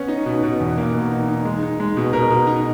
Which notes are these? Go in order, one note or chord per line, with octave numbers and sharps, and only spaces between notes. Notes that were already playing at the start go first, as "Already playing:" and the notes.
Already playing: B3 C#4
D#4
B2
B2
E2
A#3
B2
D#4
D#4
G#3
D#4
G#3
B2
B2 A#4
B2
D#4